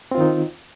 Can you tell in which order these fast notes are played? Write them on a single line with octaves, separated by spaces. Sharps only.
C4 F4 D#3 D#4